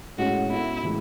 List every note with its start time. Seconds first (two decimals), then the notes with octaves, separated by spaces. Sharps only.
0.18 A2 G#3 C#4 F#4
0.50 B3 E4 F#4 A4 E5
0.82 A2 E3 G#3